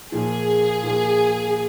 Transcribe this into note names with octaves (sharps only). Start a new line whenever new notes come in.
A#2 F3 A#3 G#4
A#2 F3 A#3